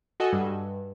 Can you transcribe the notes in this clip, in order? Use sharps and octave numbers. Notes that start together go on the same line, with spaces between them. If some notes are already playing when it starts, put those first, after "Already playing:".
F#4 A4 D#5 F#5 G#5 E6
G2 G3